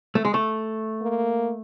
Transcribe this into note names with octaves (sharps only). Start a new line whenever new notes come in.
A3
G#3
A3
A#3